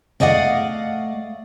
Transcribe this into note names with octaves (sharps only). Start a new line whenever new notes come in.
A3 D5 D#5 F5 F#5